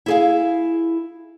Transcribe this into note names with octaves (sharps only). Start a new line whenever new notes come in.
E4 G#4 F5